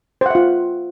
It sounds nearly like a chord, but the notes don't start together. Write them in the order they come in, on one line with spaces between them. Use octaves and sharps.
C5 F#5 E5 F4